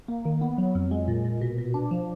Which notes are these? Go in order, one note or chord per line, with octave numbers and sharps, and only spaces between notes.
A#3
D#3
B3
F#3
F2
G#3
A#2
A#2
B2
B2
D4
F3